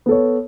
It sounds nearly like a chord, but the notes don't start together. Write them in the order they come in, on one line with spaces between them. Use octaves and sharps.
B3 A4 C#5